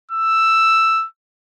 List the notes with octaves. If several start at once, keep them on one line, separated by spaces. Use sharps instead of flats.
E6